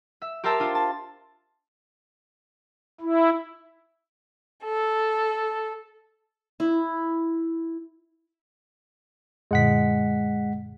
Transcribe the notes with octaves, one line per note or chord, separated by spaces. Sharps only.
E5
G4 A#4 C5 E5 A5 A#5
D4 F4
A5
E4
A4
E4
F#2 A#2 D3 G#3 F#5 B6